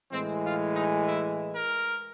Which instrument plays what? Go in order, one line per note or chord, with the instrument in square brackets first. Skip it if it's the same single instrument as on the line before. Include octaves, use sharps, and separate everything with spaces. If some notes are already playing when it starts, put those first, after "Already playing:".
[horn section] A2 E3 G#3 C4
F4
D#4
E4
A#4